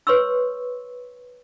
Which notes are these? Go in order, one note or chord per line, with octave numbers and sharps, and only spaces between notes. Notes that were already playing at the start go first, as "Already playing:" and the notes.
B4 C#5 C6 C#6 E6